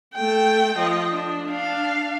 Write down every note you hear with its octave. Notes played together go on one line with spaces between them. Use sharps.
A3 G5
F3 D#5
D4
D4 F5